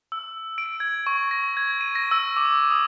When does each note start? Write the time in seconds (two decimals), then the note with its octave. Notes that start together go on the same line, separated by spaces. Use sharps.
0.12 E6
0.58 D7
0.80 G#6
1.07 C#6
1.31 A#6
1.57 G#6
1.81 D#7
1.95 A#6
2.11 E6
2.37 D6
2.71 D#6